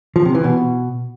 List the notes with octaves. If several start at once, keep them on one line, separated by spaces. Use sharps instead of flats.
F3
C3
E3
B2